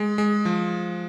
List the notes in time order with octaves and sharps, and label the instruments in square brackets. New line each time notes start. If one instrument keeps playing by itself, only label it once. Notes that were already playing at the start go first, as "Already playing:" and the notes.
Already playing: [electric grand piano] G#3
G#3
F3